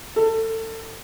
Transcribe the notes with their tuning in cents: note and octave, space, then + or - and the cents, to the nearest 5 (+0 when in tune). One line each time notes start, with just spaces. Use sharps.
A4 +25